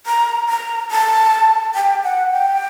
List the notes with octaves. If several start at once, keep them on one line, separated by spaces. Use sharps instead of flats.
A#5
A#5
A5
G5
F#5
G5